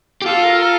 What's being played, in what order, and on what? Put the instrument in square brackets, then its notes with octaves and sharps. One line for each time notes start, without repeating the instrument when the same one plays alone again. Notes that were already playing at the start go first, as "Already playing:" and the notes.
[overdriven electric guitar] G4
[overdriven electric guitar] F4 [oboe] A4
[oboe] A#4
A4